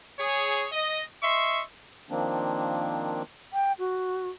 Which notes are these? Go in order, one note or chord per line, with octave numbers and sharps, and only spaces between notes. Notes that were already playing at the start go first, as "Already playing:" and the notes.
G#4 C#5
D#5
D#5 E5 C6 C#6
D#3 F3 A#3 C4 D4
G5
F#4